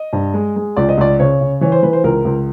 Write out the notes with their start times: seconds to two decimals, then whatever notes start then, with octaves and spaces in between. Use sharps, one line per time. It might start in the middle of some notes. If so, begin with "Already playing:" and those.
Already playing: D#5
0.13 G2
0.34 G#3
0.56 G#3
0.77 C#2 D5
0.89 D#5
0.98 C#2 D5
1.20 C#3 C#5
1.41 C#3
1.61 E3 C#5
1.72 C5
1.83 E3 B4
1.93 C5
2.04 C#2 A#4
2.25 C#2